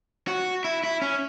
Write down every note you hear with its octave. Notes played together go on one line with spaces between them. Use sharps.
F#4
E4
E4
C#4